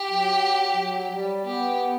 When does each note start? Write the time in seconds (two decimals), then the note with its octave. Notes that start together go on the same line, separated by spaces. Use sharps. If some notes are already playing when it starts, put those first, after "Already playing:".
Already playing: G4
0.11 F#3
0.78 F#3
1.11 G3
1.45 B3 G4